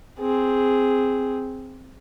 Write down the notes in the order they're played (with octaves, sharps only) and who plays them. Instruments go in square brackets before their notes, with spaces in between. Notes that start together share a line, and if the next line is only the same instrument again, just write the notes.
[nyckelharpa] C4 G#4